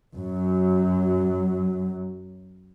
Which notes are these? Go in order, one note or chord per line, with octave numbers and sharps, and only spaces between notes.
F#2 F#3